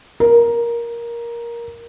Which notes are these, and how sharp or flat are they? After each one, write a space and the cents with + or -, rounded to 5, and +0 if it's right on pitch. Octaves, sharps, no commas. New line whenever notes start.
A#4 +10